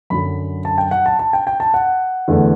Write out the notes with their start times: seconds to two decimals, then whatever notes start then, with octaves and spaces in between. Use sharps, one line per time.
0.10 F#2 D3 F#3 B5
0.65 A5
0.78 G5
0.91 F#5
1.06 A5
1.19 A5
1.33 G5
1.47 G5
1.60 A5
1.74 F#5
2.28 E2 D3 A3